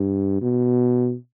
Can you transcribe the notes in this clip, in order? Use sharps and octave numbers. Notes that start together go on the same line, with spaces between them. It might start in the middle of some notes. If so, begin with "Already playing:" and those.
Already playing: G2
B2